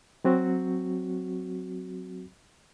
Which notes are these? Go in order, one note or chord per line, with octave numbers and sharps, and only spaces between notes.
F#3 C4 F#4